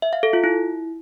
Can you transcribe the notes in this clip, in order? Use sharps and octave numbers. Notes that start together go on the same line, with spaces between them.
E5
F5
A4
F4
E4